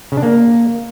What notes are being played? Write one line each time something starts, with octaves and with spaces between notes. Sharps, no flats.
C#3
D4
A#3